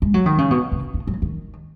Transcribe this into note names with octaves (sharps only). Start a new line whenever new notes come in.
G#3
F#3
D#3
C#3
B2
C#3
D#3
F#3
D#3